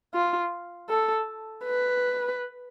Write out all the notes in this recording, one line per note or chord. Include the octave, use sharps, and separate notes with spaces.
F4
A4
B4